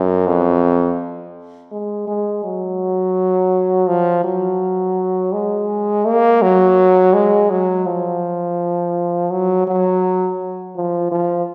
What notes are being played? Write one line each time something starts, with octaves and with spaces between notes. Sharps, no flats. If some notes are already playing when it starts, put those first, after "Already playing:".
Already playing: F#2
F2
G#3
G#3
F#3
F3
F#3
G#3
A#3
F#3
G#3
F#3
F3
F#3
F#3
F3
F3